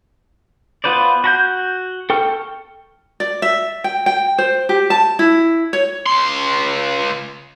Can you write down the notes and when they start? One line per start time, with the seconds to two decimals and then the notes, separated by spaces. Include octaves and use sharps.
0.84 B3 F4 B4 C5 D5
1.24 F#4 A#5 G6
2.10 A4 G5 C#6 F6
3.20 D5
3.42 E5
3.84 G5
4.06 G5
4.38 C5
4.69 G4
4.90 A5
5.19 E4
5.73 C#5
6.06 C#2 C6